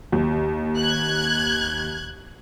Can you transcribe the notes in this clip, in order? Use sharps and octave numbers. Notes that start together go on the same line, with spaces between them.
D#2
F#6 G#6